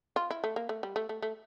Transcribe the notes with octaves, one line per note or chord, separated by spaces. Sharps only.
F4
E4
A3
A#3
A3
G3
A3
A3
A3